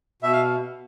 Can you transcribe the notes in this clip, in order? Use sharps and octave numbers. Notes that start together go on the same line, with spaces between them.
B2 E5
F5